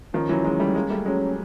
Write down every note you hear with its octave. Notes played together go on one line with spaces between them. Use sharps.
D#3 F3 C#4
E3 F#3
F#3 G#3
G3 A3
G#3 A#3
G3 A3
F#3 G#3 C#4